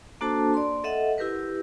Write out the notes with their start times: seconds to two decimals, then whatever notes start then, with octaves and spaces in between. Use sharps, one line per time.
0.21 A#3 D4 F#4 A4 C5 A5
0.54 D5 C6
0.84 A4 D#5 E5 F#5
1.18 E4 G4 A#4 B4